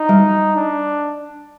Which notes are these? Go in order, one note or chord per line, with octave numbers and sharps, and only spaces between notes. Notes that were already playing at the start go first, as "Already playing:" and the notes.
Already playing: D#4
G3
D4